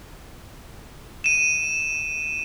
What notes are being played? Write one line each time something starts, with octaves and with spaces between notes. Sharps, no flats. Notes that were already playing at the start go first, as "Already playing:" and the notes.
D#7 E7